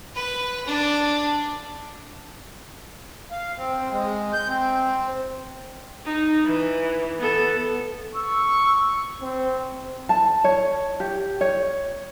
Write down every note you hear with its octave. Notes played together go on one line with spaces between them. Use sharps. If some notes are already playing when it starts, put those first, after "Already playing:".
B4 B5
D4
F5
C4
G#3
G6
C4
D#4
E3
B3 A4
C#6 E6
C4
A5
C#5
G4
C#5